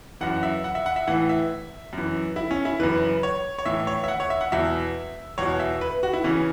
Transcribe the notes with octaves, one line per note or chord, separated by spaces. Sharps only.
F#2 E3 F#5
E5
F#5
E5
F#5
E5
A2 E3 F#5
E5
F#2
E3
E4
C#4
E4
F#2 C#3 E3 B4
C#5
C#5
A2 E3 E5
C#5
E5
F#5
C#5
E5
F#5
E2 B2 E5
E2 B2 C#5
E5
B4
F#4
E4
C#3 E3 C#4